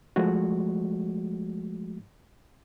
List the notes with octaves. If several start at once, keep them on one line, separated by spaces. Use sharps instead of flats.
F3 G#3 A3 F#4